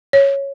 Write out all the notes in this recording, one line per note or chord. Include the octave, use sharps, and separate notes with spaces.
C#5